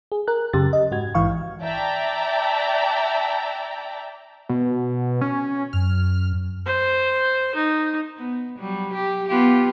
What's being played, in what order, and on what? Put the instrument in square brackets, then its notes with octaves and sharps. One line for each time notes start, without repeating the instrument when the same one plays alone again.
[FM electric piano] G#4
A#4 F#6
F#2 C#3 G4 A6
D#5
G#2 F#4 G#6
A#1 G#2 E3 F5 C#6
[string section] D5 E5 G5 A5 A#5
[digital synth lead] B2
C#4
[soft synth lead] F#2 [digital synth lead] F6
[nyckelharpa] C5
D#4
[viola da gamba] B3
F#3 G3
G4
B3 F4 G4